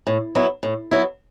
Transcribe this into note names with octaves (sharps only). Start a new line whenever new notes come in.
A2
F#3 B3 E4
A2
F#3 B3 E4